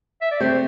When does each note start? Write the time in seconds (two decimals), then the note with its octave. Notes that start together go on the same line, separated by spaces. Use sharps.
0.21 E5
0.31 D5
0.40 A3 C4 C5